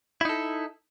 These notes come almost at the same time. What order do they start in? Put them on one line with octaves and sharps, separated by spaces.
E4 D#4 A4